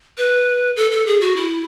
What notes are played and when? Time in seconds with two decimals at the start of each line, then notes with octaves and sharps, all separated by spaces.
0.18 B4
0.76 A4
0.91 A4
1.06 G#4
1.21 F#4
1.36 E4